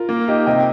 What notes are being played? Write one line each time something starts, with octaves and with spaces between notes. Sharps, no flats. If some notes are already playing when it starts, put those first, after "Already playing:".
Already playing: F4 A#4
A#3
D#4 G4 D#5
C3 D#5 G5